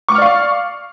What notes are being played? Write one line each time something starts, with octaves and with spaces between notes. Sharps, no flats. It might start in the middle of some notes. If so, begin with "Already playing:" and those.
D5 F5 C#6 D6 F6